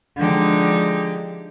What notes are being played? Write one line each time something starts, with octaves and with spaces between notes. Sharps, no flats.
D3 F3 G#3 D#4 G4